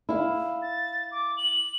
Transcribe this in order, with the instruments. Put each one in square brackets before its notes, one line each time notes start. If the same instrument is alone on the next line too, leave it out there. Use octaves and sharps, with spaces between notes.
[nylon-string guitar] E4 F5
[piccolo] A6
D6
F#7